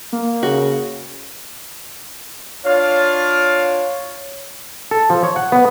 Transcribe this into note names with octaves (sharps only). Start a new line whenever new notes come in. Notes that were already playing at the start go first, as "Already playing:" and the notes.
A#3
C#3 F#4
D4 F4 C#5 F5
A4
F3
C#5
F#5
B3